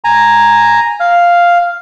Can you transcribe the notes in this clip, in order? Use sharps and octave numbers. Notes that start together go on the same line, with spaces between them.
G#5 A#5
F5